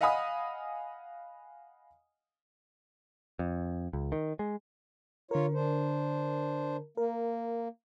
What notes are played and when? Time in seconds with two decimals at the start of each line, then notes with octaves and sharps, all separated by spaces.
0.01 D#5 F5 F#5 G#5 B5 D#6
3.39 F2
3.93 C#2
4.12 D#3
4.39 G#3
5.31 D3 F4 A#4 C#5
5.54 D4 C5
6.97 A#3 A#4